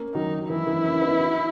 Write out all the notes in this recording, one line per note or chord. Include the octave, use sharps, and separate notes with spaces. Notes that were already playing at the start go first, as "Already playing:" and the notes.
Already playing: A#3 C#4
D#3 F#3 D#4
E3 E4
E3
A#3 C#4
B3 D#4
D#4 F#4